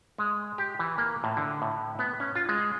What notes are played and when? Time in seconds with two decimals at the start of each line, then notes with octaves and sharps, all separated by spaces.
0.18 G#3
0.58 G4
0.79 E3
0.98 A#3
1.24 A2
1.37 D3
1.62 A2
1.99 B3
2.20 C#4
2.35 F4
2.49 G#3